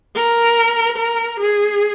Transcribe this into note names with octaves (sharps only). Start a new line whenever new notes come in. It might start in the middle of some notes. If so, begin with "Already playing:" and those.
A#4
A#4
G#4